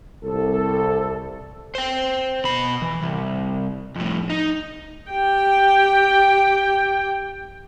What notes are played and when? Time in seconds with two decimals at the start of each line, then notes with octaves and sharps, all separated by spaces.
0.24 C2 A4
1.75 C5 G5
2.44 B2 B5
2.82 E3
3.02 C2
3.96 F2 A2
4.30 D#4
5.11 G4 G5